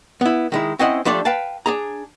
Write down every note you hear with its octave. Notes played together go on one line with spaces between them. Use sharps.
B3 E4
D#3 G#3 E4
C4 C#4 E4 C5 D#5 F#5
F3 G3 A3 D4 A4 D5
B4 F5 G5 A5
D4 G#4 A#5